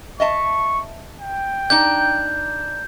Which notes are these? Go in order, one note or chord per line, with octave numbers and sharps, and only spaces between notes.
D#5 E5 A5 C#6
G5
D4 D#4 G6